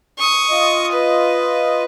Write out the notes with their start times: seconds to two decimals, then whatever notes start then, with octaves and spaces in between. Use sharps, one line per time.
0.18 C#6 D#6
0.50 F4 D#5
0.92 B4